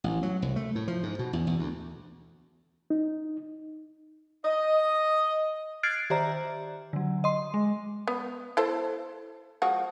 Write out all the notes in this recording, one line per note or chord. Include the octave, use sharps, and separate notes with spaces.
A1
F#3
C2
A3
A2
F3
G#2
B2
E2
E2
D2
D#4
D#5
F6 F#6 G#6 A6 C7 D7
D#3 G4 C5 D5 E5 A#5
D3 F#3
D#5 C6
G#3
B3
E4 A4 C5
F3 G#3 F#4